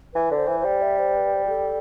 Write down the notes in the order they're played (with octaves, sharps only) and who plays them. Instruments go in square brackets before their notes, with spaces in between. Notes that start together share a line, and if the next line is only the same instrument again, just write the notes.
[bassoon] E3 [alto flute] B4
[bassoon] D3
[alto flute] C5
[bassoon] E3
[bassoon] G3 [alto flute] C5
[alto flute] E5
C5
B4
C5
G4
A4